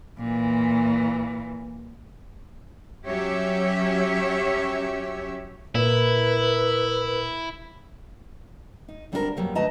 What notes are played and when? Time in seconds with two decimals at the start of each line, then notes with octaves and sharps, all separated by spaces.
0.18 A#2 E3
3.06 F#3 C#4 G4 C#5 E5
5.75 A#2 E4 A#4 B4
8.88 D#4
9.12 D2 G3 C4 D4 E4 A#4
9.37 F2 B2 F#3 G3 A#3
9.55 D3 A3 B4 D#5 A5 A#5